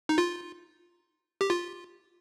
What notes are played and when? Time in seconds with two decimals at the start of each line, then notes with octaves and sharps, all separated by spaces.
0.09 D#4
0.18 F4
1.41 G4
1.50 F4